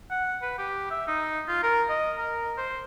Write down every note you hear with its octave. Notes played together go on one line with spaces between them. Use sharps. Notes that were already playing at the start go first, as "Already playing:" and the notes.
F#5
B4
G4
E5
D#4
F4
A#4
D#5
A#4
C5